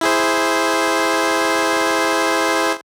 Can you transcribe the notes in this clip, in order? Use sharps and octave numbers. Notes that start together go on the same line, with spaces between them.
E4 G#4 C5